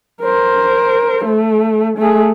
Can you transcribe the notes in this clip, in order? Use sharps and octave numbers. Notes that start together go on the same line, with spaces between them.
A#4 C5
A3
A3 G#4